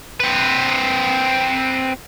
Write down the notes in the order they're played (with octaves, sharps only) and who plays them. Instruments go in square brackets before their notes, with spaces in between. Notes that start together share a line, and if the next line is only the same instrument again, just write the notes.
[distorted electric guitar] C4 B4